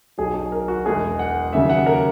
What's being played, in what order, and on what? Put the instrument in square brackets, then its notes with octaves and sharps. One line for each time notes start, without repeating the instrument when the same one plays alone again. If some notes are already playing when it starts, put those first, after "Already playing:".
[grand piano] B1 B2 F#3 G#4
G#4
A#4
F#4
E1 E2 B2 G#3 G#4
F#5
D#2 C#3 F#3 E5
F#5
A#4